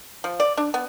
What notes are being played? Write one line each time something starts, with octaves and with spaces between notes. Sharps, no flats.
F3
D5
D4
B3